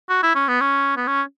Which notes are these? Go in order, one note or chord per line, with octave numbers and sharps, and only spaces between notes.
F#4
E4
C#4
B3
C#4
B3
C#4